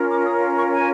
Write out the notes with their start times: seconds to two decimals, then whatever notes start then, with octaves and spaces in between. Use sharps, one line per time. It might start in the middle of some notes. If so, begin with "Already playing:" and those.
Already playing: C#4 F4 A#4
0.10 D6
0.26 D#6
0.57 C#6
0.72 G#5